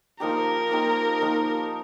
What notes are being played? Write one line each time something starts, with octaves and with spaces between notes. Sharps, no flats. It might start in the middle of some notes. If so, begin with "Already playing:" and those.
F3 A#3 D#4 G4 A#4
F3 A#3 D#4 G4
F3 A#3 D#4 G4